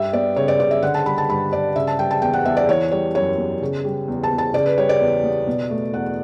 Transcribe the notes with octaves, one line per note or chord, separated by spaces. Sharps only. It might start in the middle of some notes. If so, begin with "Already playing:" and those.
Already playing: G2 G3 E5
B3 D5
C#3 C#5
D5
C#3 D5
E5
D3 F#5
A5
G3 B5
A5
G2 B5
G2 D5
C#3 E5
A5
G3 G5
A5
E2 G5
F#5
E2 E5
D5
E3 C#5
G3 C#5
F#2 C#5
B3
C#3
G3
E2
A5
E2
A5
C#3 D5
B4
G3 C#5
D5
E2
B3
B2
A3
E2 F#5